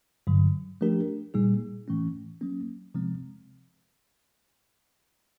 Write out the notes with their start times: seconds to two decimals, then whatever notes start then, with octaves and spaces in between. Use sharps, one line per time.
0.27 G2 D3 F#3
0.81 F3 A3 D4 G4 A#4
1.34 A#2 G3 A#3 D#4 G#4
1.88 A2 E3 A3 C#4
2.41 F#3 A#3 C#4
2.94 C3 F3 G#3 C4